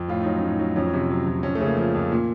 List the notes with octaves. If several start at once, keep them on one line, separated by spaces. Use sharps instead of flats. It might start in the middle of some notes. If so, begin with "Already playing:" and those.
Already playing: F2
A2 F4
F#3 D#4
C#4
A2
D#4
F#3
F2 C#4
C3
F#3
F2
F2 C#4
A3
C#3
A#3
F3
F2
A#2